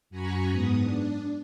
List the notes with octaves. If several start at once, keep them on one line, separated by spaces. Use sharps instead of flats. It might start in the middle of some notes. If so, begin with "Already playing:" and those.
F#2 F#4 G#5 A#5 B5 C#6
G#2 B3 D#6
D4